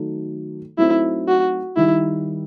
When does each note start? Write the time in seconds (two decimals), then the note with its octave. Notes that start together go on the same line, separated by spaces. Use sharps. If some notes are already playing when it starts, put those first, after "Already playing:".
Already playing: D#3 F#3 A3 D#4
0.78 F#3 A3 C4 D#4 E4
1.28 F#4
1.76 D#3 G3 D#4 E4